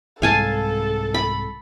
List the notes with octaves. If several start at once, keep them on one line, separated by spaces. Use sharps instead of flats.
C2 G#2 A4 F5 G#5 A5
B5